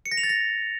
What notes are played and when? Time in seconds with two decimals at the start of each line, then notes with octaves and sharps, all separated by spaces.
0.06 C#7
0.11 A#6
0.17 F7
0.23 A6
0.29 A#6